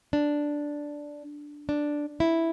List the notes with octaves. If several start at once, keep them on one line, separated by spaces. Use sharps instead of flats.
D4
D4
E4